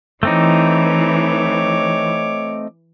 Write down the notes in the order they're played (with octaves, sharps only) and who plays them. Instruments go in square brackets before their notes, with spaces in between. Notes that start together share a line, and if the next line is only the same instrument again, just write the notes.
[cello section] E3 [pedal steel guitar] A3 C4 D#4 [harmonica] C#5 D6